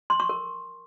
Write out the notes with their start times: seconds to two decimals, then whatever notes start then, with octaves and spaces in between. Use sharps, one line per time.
0.10 C6
0.20 C#6
0.29 A#4